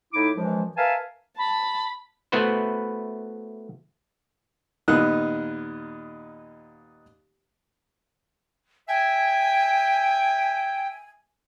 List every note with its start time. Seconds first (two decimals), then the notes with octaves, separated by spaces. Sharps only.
0.14 A2 D#4 E4 D6
0.36 F#2 E3 F3 G#3
0.77 A#4 B4 E5 F5 G#5 A5
1.37 A5 B5
2.32 A3 B3 E4 F#4 B4 C5
4.88 D#2 A#2 B3 D#4 A#4 F#6
8.88 E5 G5 G#5